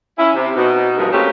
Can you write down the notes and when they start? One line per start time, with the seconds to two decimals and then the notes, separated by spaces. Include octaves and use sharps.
0.18 C#4 E4
0.35 C3
0.54 B2 D#4
0.98 E2 G2 F3 A#3 D#4 G#4
1.11 A3 A#3 C4 C#4 G4 B4